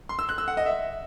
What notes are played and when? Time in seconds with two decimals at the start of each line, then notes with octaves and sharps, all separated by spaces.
0.09 C6
0.19 E6
0.29 F#6
0.38 E6
0.48 F#5
0.57 D#5
0.66 E5